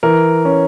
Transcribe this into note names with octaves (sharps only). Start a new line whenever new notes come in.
E3 A#4
C#4